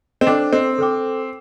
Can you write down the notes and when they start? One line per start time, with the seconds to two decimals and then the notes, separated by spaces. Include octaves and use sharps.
0.21 C4
0.27 D4 A4 C5 G5 D6
0.53 C4
0.78 A4 C5 G5 D6